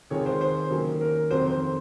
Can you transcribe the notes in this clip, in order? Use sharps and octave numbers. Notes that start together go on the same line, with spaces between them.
D#3 G#3 C4 F4 C#5
C5
C5
D#3 F#3 A#3 C#4
A#4
F2 D#3 F#3 C4 C5
C5